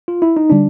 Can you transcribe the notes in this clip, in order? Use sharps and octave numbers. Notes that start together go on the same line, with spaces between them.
F4
E4
D#4
D3 G3 D4